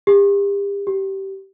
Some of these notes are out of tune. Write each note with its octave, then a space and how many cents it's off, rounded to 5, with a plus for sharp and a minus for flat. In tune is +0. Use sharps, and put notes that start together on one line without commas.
G4 +35
G4 -20